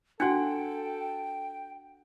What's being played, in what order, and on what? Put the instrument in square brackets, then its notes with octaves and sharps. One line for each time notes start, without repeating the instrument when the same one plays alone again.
[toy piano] D4 F#4 [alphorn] A4 [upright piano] F#5 F#6 C#7 [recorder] G5